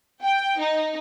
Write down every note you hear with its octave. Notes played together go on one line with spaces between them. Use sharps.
G5
D#4